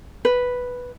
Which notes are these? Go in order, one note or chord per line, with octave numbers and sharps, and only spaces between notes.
B4